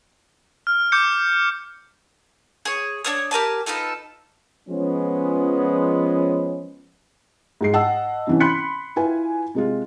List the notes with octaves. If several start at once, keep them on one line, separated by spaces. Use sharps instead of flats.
F6
D6 G6 C#7
G#4 C#5
D4 C#5 D#6
G4 A#4 G#5 A5
B3 D#4 F4 A4
F3 G#3 B3 C#4
G#2 G#3 C7
D#5 F#5 A5 E6
C3 E3 C#4
B5 C6 F#6 B6 C#7
E4 F4 B4 G#5
C3 G#3 F4